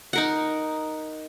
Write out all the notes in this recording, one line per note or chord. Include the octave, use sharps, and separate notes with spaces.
D#4 A#4 F#5